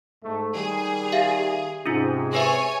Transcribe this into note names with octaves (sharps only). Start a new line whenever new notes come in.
G#2 A3
D#3 G3 G#4
G4 E5 F5
G#2 C3 G#3 C#4 D#4 F4
G#4 B4 C#5 E5 G#5